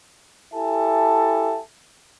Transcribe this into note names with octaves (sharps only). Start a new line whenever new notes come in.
E4 G4 A4 E5 G#5 A5